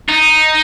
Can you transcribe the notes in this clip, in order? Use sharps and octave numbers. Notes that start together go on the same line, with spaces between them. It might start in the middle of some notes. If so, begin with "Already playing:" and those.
D#4